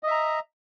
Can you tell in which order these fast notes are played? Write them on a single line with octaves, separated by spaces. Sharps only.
D#5 E5 A#5